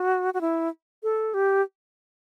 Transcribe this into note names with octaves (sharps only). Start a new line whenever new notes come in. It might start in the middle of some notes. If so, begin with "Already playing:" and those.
Already playing: F#4
F#4
E4
A4
G4